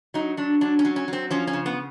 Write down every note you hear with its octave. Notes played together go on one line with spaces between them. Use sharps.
F#3 D#4
F#3 D4
F#3 D4
C#4
F#3
C#4
F#3 C4
F3 C#4
C#4
C#3
B3